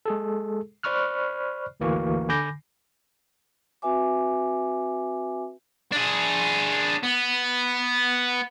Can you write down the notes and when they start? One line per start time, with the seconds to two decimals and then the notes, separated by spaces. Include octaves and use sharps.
0.06 G#3 G#4 A4
0.83 C5 D5 B5 C#6 F6 F#6
1.80 G#1 D2 E3 A#3 F#4 C#6
2.29 D3 G#5 B5 D6 G6 A#6
3.82 C4 F#4 B4 E5 G#5 D6
5.92 D4 G#4
7.03 B3